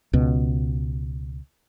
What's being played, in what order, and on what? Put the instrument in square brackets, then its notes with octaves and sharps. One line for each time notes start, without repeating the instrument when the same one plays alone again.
[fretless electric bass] C#2 B2